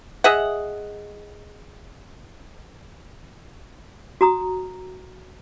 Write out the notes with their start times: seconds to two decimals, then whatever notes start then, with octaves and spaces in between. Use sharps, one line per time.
0.24 G#4 D#5 E5 F#5
4.21 F#4 A#5 D#6